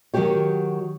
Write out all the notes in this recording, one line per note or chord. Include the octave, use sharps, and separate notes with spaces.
D#3 F#3 G3 F#4 G4 C#5